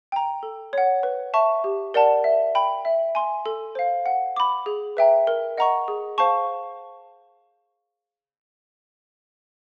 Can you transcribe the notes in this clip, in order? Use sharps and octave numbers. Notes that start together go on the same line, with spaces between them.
G5 A#5
A4
C#5 F#5
B4
E5 A5 C#6
G4
A#4 D5 F#5 A5
E5
G5 B5
E5
G#5 C6
A4
C5 F5
F#5
B5 D6
G#4
B4 E5 G5 A#5
A#4
D#5 F#5 A#5 C#6
G#4
C5 F5 A5 C#6